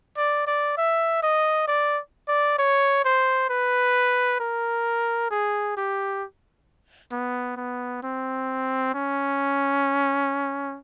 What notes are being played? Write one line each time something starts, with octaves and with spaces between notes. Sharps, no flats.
D5
D5
E5
D#5
D5
D5
C#5
C5
B4
A#4
G#4
G4
B3
B3
C4
C#4